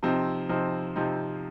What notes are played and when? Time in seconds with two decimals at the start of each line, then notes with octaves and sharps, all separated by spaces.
0.03 C3 F3 C4 D#4
0.49 C3 F3 C4 D#4
0.96 C3 F3 C4 D#4